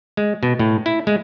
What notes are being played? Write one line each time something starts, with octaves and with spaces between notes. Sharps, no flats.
G#3
B2
A2
E4
G#3